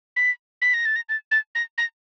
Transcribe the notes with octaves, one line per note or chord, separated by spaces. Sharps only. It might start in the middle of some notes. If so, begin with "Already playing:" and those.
B6
B6
A#6
A6
A#6
A6
A6
A#6
A#6